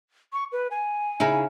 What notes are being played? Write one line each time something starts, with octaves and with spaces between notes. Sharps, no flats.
C#6
B4
G#5
C#3 D#4 E4